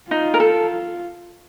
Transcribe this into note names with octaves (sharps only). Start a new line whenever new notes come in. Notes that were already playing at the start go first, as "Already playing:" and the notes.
D#4 F4
A#4
A4